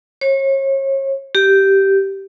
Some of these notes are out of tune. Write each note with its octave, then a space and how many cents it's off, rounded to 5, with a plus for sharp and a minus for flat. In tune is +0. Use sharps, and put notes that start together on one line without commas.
C#5 -35
G4 -10